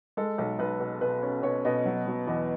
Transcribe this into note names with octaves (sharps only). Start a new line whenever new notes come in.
G#3 A4
B1
B1 B4
B2
B2 B4
C#4
B2 C#5
B2 D#5
F#3
F#3
E2 D#5